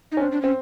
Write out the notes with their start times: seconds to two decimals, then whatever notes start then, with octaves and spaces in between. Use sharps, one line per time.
0.12 D#4
0.17 C#4
0.21 C4 D4
0.32 D4
0.42 C4 C#4